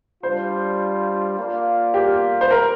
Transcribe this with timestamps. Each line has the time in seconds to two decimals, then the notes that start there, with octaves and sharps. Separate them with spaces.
0.23 G3 D4 F4 C5
1.37 A#3 F4 D5 F5
1.94 G4
2.41 C5
2.51 A#4